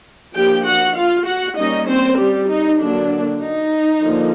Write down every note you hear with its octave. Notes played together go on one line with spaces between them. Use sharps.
F3 A#3 D4 G4 G5
F#4 F#5
F4 F5
F#4 F#5
G3 A#3 C#4 D#4 D#5
C4 C5
G3 G4
D#4
D3 F#3 A#3 D4
D#4
D3 F3 A#3